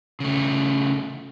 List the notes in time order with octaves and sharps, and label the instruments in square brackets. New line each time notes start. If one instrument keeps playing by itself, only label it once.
[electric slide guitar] C#3 A3